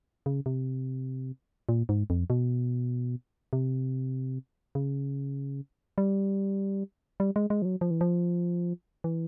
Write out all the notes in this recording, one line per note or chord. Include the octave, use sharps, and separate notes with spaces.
C#3
C3
A#2
G#2
F2
B2
C3
C#3
G3
G3
G#3
G#3
F3
F#3
F3
E3
F3
E3